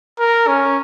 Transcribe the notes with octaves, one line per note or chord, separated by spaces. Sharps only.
A#4
C#4